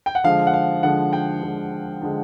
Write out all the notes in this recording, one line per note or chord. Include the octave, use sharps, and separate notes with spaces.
G5
F#5
D3 F3 G#3 F5
F#5
F5
D3 F3 G#3 F#5
G5
D3 F3 G#3
D3 F3 G#3